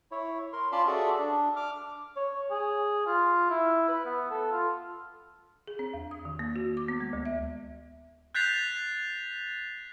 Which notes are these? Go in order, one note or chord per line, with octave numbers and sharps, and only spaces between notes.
E4 C#5
A#4 C6
C#4 F4 D5 A5 B5 C6
F#4 G#4 A4 D5 E5
D4
D6 F6
C#5
G#4
F4
E4
B4
B3
A4
F4
G#4
C4
E2
D#6
D#3
A#3
F#4
D6
B3
G#3
D2
E5
F#6 G6 A6 B6 C7 F7